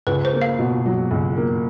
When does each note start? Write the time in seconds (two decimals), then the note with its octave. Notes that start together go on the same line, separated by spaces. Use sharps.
0.07 C#2 B4
0.25 C5
0.33 A#3
0.42 F5
0.59 B2
0.86 F#3
1.11 C#2
1.37 A#3